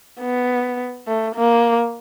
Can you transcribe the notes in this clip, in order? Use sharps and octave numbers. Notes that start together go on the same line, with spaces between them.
B3
A3
A#3